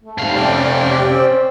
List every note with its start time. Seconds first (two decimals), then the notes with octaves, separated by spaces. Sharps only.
0.03 A3
0.18 G#2 C3 G3 F5
0.35 C#4 D5 G5
0.88 G4
1.10 C4